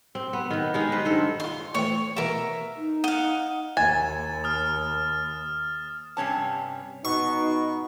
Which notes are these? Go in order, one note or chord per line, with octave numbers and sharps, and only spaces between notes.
C4
B3
D#3 B3
D#3 G#3 D#4
B4 C5
G2 D#3 A4 C5
D#4 F4 C6
A2 E3 C4 C#5
B2 E3 A#3 A#4 E5
D#4
D#5 F5 F#5
D#2 G#5 A6 E7
D#6 F6
G2 C3 C#4 A5
B2 D#4 C#6